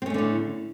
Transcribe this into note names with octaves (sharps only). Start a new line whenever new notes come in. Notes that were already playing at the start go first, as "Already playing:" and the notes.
A2 D3 A3 C4 C#4